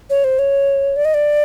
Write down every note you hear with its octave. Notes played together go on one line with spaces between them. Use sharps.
C#5
C5
C#5
D5
D#5
D5